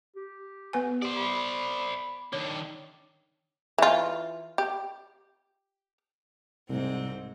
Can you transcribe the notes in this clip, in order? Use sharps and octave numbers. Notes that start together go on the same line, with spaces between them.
G4
B3 B4 G#5
G4 C5 D5
B5
D#3 D4 C#5
E3 F4
G4
C2 G#2 C4